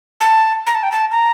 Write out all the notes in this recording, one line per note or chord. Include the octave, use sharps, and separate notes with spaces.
A5
A#5
A5
G5
A5
A#5